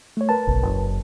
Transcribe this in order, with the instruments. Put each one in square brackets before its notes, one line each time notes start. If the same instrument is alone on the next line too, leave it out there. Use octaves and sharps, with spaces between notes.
[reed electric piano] A3 C#5
A#4 B4 A5
[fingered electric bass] F#1 B1
F#1